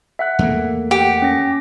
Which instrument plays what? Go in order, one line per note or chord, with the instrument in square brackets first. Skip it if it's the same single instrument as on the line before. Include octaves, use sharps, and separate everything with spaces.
[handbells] E5 F#5 F#6
[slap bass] E2 A3 A#3
[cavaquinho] G4 [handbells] F#5 G5
[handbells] C#4 A#6